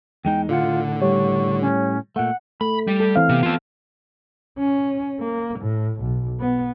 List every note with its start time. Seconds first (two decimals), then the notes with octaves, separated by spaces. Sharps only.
0.25 E2 G#3 D#4 G5
0.49 A2 D3 F4 F#5
1.02 G3 G4 C#5 C#6
1.61 C#4
2.16 A#2 A3 F#5
2.61 A3 B5
2.87 G3
3.00 A4
3.16 E3 C4 F5
3.29 C3 B3
3.43 F4 A4
4.59 C#4
5.20 A#3
5.60 A2
6.01 B1
6.40 B3